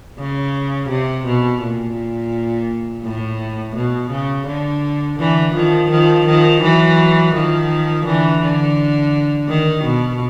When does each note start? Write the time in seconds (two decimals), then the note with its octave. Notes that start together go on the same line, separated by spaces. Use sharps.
0.19 C#3
0.89 C3
1.26 B2
1.61 A#2
3.04 A2
3.76 B2
4.11 C#3
4.47 D3
5.19 D3 E3
5.55 D#3 F3
5.90 D#3 F3
6.26 D#3 F3
6.62 E3 F#3
7.33 D#3 F3
8.05 D3 E3
8.41 D3
9.48 D#3
9.84 B2